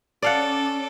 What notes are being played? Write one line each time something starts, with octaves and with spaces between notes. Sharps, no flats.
C#4 A4 D5 F5 F#5 D6